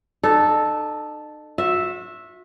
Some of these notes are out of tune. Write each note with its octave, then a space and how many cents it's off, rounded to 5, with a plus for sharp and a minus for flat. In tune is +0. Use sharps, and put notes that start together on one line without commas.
D#4 -40 A4 -5
F#4 -40 E5 +0